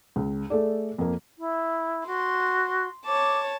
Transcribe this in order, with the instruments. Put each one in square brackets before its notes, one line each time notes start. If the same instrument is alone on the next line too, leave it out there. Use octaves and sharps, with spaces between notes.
[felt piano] C#2
A3 G#4 A4 D5
F2 A#3
[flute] E4
[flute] F#4 [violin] C6
[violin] C#5 A5 [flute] D6